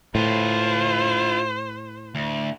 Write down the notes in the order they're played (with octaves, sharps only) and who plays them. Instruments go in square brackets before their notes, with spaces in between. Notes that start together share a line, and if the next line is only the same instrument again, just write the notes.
[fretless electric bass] A2 [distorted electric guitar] F4 B4 [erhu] C5
[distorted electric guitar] D2